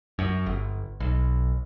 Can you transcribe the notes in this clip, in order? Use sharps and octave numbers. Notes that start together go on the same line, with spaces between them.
F#2
G1
B1